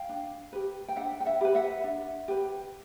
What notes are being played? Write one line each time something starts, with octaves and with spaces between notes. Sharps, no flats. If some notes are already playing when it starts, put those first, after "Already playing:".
Already playing: F5 G5
D4
G4 B4
G5
D4 E5 F#5
G5
E5 F#5
G4 B4
E5 F#5
D4
G4 B4